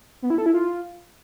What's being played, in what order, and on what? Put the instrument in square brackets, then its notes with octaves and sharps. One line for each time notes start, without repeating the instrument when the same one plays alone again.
[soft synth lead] B3
E4
A4
E4
F4